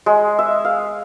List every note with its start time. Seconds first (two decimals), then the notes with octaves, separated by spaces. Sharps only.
0.06 G#3
0.39 E5
0.65 F5